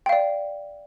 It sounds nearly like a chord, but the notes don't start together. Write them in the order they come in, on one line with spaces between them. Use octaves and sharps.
G5 F5 D5